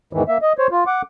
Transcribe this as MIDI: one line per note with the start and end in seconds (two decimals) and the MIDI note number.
0.13 0.23 40
0.13 0.23 44
0.13 0.23 51
0.13 0.23 52
0.28 0.38 58
0.28 0.38 76
0.42 0.53 75
0.58 0.67 72
0.58 0.67 73
0.71 0.84 65
0.87 1.02 78
0.87 1.02 86